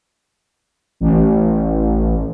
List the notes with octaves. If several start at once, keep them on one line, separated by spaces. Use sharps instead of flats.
A1